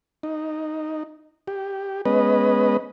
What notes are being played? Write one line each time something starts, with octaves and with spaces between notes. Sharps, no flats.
D#4
G4
G#3 B3 C#4 B4 D#5